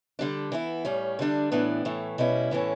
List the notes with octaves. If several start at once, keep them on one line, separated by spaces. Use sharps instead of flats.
D3 G3 D4
E3 B3 E4
A2 G3 C#4
D3 G3 D4
A2 E3 B3 D4
A2 E3 A3
B2 G3 C#4 E4
A2 E3 A3 C#4